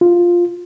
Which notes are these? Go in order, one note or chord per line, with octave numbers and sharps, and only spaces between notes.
F4